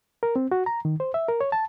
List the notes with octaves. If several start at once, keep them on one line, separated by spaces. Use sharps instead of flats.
A#4
C4
F#4
A#5
D#3
C5
E5
A#4
C#5
A5